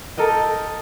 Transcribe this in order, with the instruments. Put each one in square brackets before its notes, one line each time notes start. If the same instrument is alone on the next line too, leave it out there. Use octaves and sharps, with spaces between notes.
[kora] A4 A#4 D#5 G5